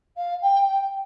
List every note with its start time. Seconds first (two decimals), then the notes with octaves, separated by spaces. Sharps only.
0.16 F5
0.41 G5
0.67 G5